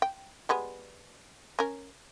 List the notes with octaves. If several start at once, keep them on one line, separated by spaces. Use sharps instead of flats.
G5
G3 G#3 B3
C#4 A#4